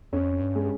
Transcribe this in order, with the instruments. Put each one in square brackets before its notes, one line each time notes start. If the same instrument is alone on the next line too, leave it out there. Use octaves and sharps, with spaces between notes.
[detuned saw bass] F2 [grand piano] C#4
[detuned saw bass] G2
[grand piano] G#3